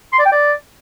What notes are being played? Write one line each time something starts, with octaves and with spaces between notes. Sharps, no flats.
C6
D5
G5
D5